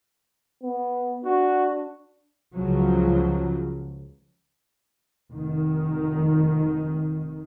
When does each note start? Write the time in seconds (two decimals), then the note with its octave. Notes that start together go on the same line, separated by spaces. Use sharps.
0.63 B3
1.25 D4 F#4
2.55 C#2 C#3 F3 F#3
5.33 F1 D#3